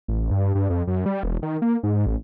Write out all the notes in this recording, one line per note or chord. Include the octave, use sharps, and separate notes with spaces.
A1
G2
G2
F2
F#2
G3
E1
D#3
A#3
G#2
A1